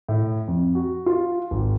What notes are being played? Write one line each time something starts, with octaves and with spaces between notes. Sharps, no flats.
A2
F2
F#4
F4
G#1